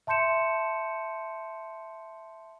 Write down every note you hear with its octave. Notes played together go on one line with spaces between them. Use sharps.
E5 A5 C6 G6 C#7 E7